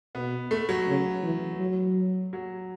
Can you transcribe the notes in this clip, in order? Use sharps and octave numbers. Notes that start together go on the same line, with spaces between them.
B2 B3
A3
F#3
C#3
E3
F#3
F#3